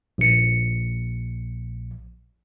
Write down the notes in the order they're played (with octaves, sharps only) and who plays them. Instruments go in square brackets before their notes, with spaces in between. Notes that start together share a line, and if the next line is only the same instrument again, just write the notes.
[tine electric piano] A#1 C#7